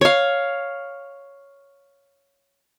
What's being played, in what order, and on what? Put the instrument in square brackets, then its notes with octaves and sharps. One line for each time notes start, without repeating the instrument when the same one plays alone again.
[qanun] C#5 F5